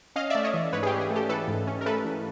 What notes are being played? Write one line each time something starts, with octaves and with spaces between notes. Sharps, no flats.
C#4 D#5 F5
A3 D5 E5
C#5 D#5
E3
G#2 B4 C#5
G#4
G4
C#4
G#4
A3
G4 A4
E3 A4 B4
G#2
C#4
A#4
A3 A4 B4
E3